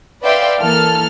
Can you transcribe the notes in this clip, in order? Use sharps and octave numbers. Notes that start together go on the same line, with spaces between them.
B4 D5 E5 F5 G5 C6
E3 A#3 A4 F6